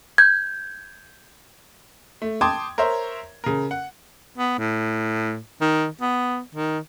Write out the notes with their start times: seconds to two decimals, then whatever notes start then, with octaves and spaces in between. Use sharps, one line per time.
0.18 G6 G#6
2.22 A3
2.41 G5 A5 C6 D6 D#6 G#6
2.78 A#4 C5 C#5 E5
3.44 C#3 A#4
3.71 F#5
4.38 B3
4.58 A2
5.61 D#3
6.01 B3
6.55 D#3